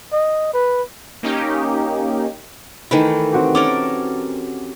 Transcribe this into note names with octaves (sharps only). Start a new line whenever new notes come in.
D#5
B4
A#3 C#4 D#4 G4
D#3 E3 A3 B4
C4 F#4 G4
C#4 A4 A#4 D6